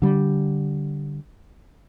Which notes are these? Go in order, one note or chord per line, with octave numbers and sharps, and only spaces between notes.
D3 G3